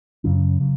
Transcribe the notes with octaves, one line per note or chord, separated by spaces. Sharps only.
F#2 C#3 F#3 C#4
C#3 F#3